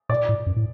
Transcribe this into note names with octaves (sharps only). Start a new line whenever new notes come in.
A#2 D5
A2
F#2
A2